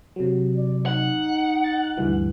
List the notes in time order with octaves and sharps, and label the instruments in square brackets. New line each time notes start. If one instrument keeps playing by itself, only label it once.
[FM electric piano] C3 F#3
[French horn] D5
[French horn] D#4 [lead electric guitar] F#5
[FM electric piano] A6
D2 G2 E3